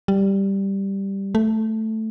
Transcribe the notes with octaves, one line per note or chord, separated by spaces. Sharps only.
G3
A3